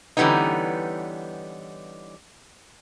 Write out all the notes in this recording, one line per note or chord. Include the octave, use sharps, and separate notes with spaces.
D3 E3 G3 B3 C#4 D#4